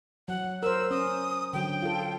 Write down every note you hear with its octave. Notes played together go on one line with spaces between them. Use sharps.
F#3 F#5
A#4 C5 E6
C#4 D#6
D3 F#3 G5
F4 A4